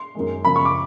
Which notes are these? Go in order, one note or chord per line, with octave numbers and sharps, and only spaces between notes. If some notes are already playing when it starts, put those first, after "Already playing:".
Already playing: C6
F#2 D#3 G#3
F#2 C#3 F3 B5
C#6
D6